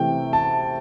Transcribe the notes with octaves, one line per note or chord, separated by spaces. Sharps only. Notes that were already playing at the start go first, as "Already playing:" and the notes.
Already playing: C3 E3 A3 G5
A5